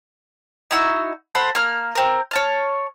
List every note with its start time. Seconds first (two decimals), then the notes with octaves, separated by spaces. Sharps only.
0.71 D#4 E4 F#4 E6
1.35 A4 C5 F#5 B5
1.55 A#3 F6
1.95 C4 A#4
2.31 C#5 A5 F6